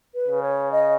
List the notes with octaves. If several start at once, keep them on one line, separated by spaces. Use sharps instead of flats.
B4
C#3
C#5
D#5